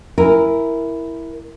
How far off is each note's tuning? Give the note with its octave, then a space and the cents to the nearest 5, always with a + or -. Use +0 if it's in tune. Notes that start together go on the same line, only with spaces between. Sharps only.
E4 +0 A#4 +0 G#5 -20